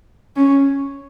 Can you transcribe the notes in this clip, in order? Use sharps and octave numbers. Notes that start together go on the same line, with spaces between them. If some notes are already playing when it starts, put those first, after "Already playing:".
C#4